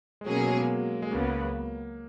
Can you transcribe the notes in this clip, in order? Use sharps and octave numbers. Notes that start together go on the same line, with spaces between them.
G#3
B2 F#3 A#3 C#4 G#4
F#3
G#3
A#3
G#3
C#2 C#3 F#3 A#3 B3